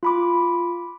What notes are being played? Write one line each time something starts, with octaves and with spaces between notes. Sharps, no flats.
F4 B5 D6